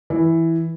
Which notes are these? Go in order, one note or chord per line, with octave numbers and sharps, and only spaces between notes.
E3